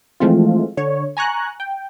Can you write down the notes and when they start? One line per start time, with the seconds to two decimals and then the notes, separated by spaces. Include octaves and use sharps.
0.20 E3 F3 G#3 A3 C4 F4
0.77 D3 C#5
1.17 G#5 A#5 C#6 F#6
1.60 G5